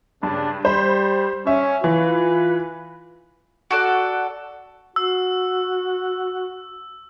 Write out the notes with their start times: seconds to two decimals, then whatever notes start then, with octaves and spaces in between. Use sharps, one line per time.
0.23 G2 C#3 D4
0.65 G3 C5 B5
1.47 C#4 E5
1.84 E3 F4 B4
3.71 F#4 A4 D5
4.96 F#4 E6